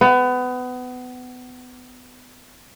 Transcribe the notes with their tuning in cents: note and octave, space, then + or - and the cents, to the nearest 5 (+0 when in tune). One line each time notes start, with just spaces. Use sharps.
B3 +25